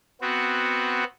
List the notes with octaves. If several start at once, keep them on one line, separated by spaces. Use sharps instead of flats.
B3 C4 F#4